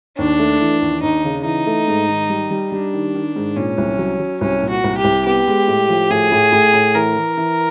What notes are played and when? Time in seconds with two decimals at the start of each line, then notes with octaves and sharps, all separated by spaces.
0.18 D#2 D4
0.39 A3
0.60 E3
0.82 D#2
1.03 D#2 D#4
1.24 C#3
1.44 E3 D#4
1.66 A3
1.88 G#2
2.08 D#3
2.30 G3
2.51 G3
2.72 G3 D4
2.94 D#3
3.15 D#3
3.36 G#2
3.56 A#2 C#4
3.78 C2
3.99 F#3
4.19 F#3
4.41 C2 C#4
4.62 A#2
4.70 F#4
4.84 C2
4.98 G4
5.04 C2
5.26 B3 G4
5.47 G#3
5.68 A2
5.89 F3
6.10 A2 G#4
6.32 A2
6.52 A2
6.73 A2
6.95 E3 A#4
7.16 E3
7.37 E3